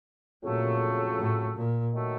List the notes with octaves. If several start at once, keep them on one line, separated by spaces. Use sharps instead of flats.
F2 A#2 C#3 F#3 A3
A2
A#2
D#3 F#3 A3